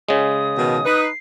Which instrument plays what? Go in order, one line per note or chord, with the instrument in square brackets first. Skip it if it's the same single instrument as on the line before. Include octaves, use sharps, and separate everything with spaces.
[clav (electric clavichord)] C#3 G#3 [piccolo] D#6
[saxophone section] B2 D#3
D#4 B4
[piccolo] C7